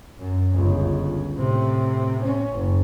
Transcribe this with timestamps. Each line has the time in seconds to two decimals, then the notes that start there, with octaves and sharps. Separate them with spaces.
0.19 F#2
0.54 G1 C#2
1.35 A2 C3
2.23 C#4
2.52 F#1